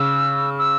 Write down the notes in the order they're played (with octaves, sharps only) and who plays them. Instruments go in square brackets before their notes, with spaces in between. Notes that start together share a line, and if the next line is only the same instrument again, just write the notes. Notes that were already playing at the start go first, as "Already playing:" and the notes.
Already playing: [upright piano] C#3 [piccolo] E6
[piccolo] E6